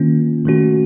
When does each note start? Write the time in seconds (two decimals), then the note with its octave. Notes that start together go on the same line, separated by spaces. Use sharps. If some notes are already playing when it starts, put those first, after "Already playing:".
Already playing: D#3 A#3 C#4 F4
0.45 D#3 A3 C#4 F#4